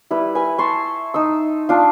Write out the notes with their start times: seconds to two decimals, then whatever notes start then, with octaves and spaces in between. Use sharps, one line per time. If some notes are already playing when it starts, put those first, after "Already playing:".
0.11 G3 E4 B4
0.35 B4 G#5
0.58 A5 C6 C#6
1.14 D#4 E6
1.69 D4 F4